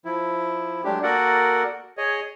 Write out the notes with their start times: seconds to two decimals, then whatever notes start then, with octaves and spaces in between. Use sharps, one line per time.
0.05 F3 E4
0.84 F#3 G#3 A3 D4 G4
1.03 A#3 F#4 A4 A#4 D5 F#5
1.97 G#4 C#5 D#5